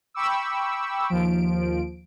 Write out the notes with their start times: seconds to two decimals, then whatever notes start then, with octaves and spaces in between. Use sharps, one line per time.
0.14 G5 B5 C#6 D6 E6
1.09 D#2 F3 D7